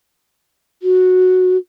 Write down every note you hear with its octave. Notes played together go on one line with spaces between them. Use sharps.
F#4